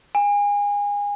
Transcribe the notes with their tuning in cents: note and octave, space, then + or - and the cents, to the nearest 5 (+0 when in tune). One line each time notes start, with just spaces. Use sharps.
G#5 -30